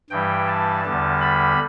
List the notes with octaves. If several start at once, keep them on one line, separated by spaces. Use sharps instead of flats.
G2 E3 G3 G5
A5
E2 D3 G3 A5
B5